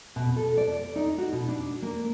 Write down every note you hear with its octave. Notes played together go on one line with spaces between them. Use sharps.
B2
A4
D5
D#4
F#4
B2
D4
A#3